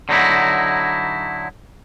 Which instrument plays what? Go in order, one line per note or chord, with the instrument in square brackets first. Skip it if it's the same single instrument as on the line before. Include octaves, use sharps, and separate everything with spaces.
[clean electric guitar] D3 F#3 D#4 E4